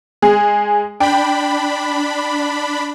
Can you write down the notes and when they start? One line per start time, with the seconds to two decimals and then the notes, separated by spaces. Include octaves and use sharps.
0.22 G#3 G#4
1.00 D4 G5 B5